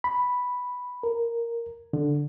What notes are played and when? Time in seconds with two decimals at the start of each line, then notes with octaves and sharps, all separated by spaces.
0.04 B5
1.03 A#4
1.93 D3